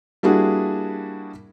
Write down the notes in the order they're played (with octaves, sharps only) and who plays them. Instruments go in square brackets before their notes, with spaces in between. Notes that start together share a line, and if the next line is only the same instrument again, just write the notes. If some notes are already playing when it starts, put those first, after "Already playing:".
[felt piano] G3 A#3 D4 E4 F#4 G#4